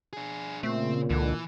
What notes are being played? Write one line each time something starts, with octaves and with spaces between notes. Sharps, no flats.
D4 G#4
A#2 C#3 A3 C4
C#2 D3 E3